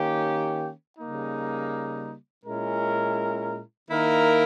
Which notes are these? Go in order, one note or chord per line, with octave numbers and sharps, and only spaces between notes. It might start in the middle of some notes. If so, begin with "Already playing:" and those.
Already playing: D#3 A#3 C#4 G4
C#3 G3 A#3 D#4
A#2 G#3 C#4 E4 A#4
D#3 A#3 E4 A#4